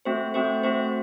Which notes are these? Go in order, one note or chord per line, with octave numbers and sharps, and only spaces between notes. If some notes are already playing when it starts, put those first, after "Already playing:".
A3 C4 F#4 C5
A3 C4 F#4 C5
A3 C4 F#4 C5